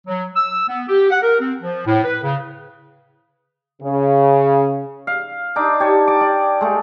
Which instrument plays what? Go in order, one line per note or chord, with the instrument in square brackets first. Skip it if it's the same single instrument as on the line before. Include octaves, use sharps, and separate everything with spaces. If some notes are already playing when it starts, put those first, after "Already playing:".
[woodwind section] F#3
E6
B3
G4
F#5
A#4
C4
F3
A2
B4
C#3
[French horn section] C#3
[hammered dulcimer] F5
D4 D#4 D6
G4 C#5 A5
A5 D6
D5
G#3 A3